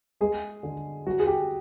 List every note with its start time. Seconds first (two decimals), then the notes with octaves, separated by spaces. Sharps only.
0.21 G#3 G#4
0.63 D3
1.06 F#3 F#4
1.20 G#4
1.27 G4